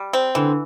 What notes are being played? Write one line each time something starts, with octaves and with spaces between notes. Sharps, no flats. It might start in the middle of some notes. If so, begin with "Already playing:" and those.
Already playing: G3
C4
D3 E3